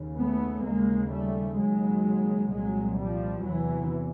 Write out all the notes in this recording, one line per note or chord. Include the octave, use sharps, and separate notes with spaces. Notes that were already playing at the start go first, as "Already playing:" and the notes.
Already playing: D#2 C#3
A3 B3
D#2 C#3 G#3 A#3
G3 A3
D#2 C#3 F#3 G#3
C2 A#2 F#3 G#3
F3 G3
E2 C3 E3 F#3